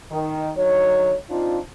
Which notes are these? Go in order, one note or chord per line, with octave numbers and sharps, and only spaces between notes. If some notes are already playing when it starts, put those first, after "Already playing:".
D#3
D3 F#3 D#4 C#5
C4 D4 D#4 F4